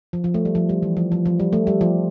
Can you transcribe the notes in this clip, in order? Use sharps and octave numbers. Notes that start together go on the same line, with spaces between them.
F3
F3
A3
G3
F3
G3
E3
F3
F3
F3
G3
A3
G3
F3